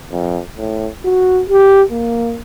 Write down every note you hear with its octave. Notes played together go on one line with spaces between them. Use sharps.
F2
A2
F#4
G4
A#3